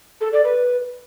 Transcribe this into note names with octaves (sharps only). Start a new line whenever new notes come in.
A4
D5
B4